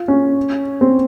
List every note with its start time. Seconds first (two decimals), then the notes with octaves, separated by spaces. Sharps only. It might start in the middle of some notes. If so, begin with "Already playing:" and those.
Already playing: F4
0.08 C#4
0.81 C4